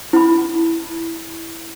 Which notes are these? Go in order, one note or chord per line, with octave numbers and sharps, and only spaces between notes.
E4 B5